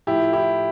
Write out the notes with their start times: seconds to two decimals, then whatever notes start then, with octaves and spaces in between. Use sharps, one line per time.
0.07 A2 F3 E4 G4
0.33 E4 G4